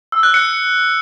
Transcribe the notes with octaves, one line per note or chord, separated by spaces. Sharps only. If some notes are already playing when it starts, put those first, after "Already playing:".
E6
F#6
C#7